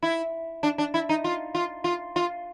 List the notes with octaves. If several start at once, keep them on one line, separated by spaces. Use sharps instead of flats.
E4
D4
D4
E4
D#4
F4
F4
F4
F4